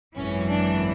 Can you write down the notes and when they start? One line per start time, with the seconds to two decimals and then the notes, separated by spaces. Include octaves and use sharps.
0.15 G#1 F#2 E3 C#4
0.49 D4